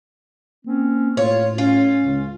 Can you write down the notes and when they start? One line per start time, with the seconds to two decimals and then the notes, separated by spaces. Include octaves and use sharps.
0.66 A#3 C4 C#4
1.17 A2 F4 C#5
1.58 C#4 F4
2.04 C#2